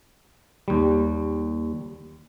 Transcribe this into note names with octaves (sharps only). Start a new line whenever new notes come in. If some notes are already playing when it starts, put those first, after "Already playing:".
D#2 G3